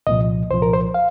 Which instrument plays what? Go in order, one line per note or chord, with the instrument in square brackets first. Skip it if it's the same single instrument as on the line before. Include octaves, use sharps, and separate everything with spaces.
[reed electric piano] C2 A#2 F3 D#5
C2 A#2 F3 C5
A#4
C5
F5